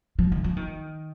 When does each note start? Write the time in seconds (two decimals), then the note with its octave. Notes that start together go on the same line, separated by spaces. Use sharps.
0.19 F3
0.32 D#3
0.44 F3
0.57 D#3